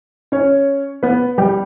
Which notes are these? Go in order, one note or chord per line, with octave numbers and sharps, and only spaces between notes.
C#4 C#5
B3 B4
G3 G4